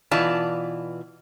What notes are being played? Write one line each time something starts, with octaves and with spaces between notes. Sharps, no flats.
B2 E3 F4 D5 A5